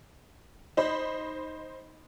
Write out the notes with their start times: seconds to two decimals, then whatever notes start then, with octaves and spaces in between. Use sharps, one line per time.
0.77 D#4 C5 D#5 B5